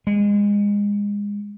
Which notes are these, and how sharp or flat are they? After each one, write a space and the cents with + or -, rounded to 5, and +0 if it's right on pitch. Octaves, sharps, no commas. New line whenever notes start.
G#3 -25